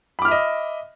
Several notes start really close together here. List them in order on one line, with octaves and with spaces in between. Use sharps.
B5 D6 F6 E5 D#5